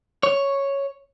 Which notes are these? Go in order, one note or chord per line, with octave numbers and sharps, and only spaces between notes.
C#5